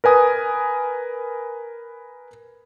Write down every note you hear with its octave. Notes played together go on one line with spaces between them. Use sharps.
A#4 B4 G#5 D#6